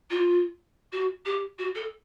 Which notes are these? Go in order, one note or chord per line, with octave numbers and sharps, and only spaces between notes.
F4
F#4
G4
F#4
A4